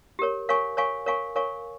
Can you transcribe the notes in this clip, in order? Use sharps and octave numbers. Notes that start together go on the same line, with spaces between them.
G4 A#4 C#5
A#4 C#5 F5 G#5 C#6
A#4 C#5 F5 G#5 C#6
A#4 C#5 F5 G#5 C#6
A#4 C#5 F5 G#5 C#6